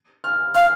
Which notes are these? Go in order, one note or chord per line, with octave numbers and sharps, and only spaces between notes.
F6
F5 F6